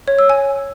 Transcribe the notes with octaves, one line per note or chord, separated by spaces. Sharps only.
C#5
E6
G#5